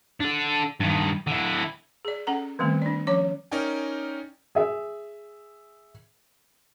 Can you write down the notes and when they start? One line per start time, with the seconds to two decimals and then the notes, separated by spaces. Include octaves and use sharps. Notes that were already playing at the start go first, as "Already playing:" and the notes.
0.20 D4 A4
0.80 G2 D#3
1.27 D3 E4
2.05 G#4 D5
2.27 C#4 A4 F#5 A#5
2.59 D3 D#3 G3 A3 B3 C4
2.82 D4 D5
3.07 F3 C#4 C#5 D6
3.51 C#4 D#4 A#4 D5 G5 G#5
4.55 G#4 E5